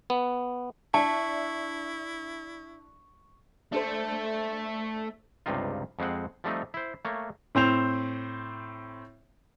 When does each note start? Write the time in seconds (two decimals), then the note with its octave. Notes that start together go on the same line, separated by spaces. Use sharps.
0.10 B3
0.94 D4 E4 E5 A5 C#6
3.72 A3 D4 A4 C5
5.46 C#2 G2 C3 D#4 F4
5.99 F2 G#3 C4 F#5
6.44 F3 G3 A3 C4 D#4
6.74 E4 C5
7.05 A3 A#3 C#5
7.55 A2 C4 C5 F7